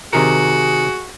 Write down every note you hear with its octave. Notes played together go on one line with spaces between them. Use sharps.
C3 D#3 F#4 G#4 A#4